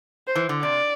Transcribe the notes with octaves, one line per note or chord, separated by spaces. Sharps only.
C5
E3
D3
C3 D5